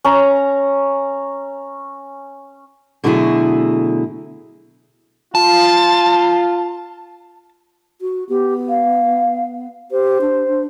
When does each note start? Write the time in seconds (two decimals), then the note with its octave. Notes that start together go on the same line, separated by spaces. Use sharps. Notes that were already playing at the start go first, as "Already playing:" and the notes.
0.04 C#4 A#5
3.04 B2 D3 F#3 A3 E4 G#4
5.35 F4 A5
8.01 F#4
8.29 B3 G4
8.69 F5
9.91 G4 C5
10.21 D4
10.48 D4